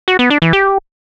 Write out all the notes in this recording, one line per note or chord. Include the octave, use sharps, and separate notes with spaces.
F#4
B3
D4
E3
G4